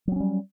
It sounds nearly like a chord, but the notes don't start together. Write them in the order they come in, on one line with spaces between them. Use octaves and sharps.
F#3 C4 C#4 G3